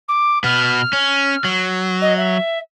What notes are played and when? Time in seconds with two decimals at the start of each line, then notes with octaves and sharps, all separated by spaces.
0.08 D6
0.44 B2 B3 F6
0.93 C#4
1.44 F#3
2.01 D#5
2.17 E5